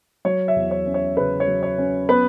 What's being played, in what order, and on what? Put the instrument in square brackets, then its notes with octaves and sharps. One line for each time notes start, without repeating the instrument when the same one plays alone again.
[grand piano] F#3 C#5
E5
E2
C#5
C#4
C#5
C#3 B4
C#5
F#3
C#5
C#4
B3 B4